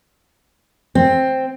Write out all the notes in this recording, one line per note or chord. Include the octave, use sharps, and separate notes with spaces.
C4